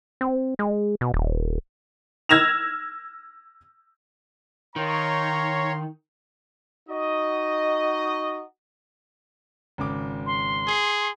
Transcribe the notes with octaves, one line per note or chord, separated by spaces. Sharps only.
C4
G#3
B2
D#1
E6 F6 G#6 A#6 E7 F7
D#3 C#5 F5 A#5 C6
D#4 F#4 D#5
G#1 C#3 D6
C6
G#4